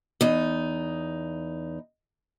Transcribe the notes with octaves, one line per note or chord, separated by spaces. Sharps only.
E2 D#4